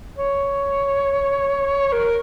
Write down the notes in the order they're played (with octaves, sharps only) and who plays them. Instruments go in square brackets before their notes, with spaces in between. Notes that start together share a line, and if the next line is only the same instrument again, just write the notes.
[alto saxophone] C#5
A#4